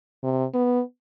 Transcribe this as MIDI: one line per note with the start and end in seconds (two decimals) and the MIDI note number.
0.23 0.45 48
0.54 0.81 59